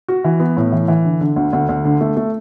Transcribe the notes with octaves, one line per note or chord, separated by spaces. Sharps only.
F#4
E3
B3
A2
E3
E3
D3
D3
D2
D2
D2
D3
A3
A3